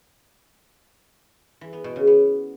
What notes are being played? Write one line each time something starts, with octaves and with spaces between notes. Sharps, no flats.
E3
B3
B2
C#3
B3